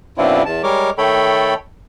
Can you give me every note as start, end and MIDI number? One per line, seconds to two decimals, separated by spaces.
0.18 0.43 42
0.18 0.43 47
0.18 0.43 60
0.18 0.43 62
0.18 0.43 64
0.18 0.43 65
0.46 0.62 40
0.46 0.62 81
0.63 0.90 55
0.63 0.90 56
0.63 0.90 70
0.63 0.90 73
0.63 0.90 86
0.98 1.54 51
0.98 1.54 57
0.98 1.54 69
0.98 1.54 73
0.98 1.54 79
0.98 1.54 83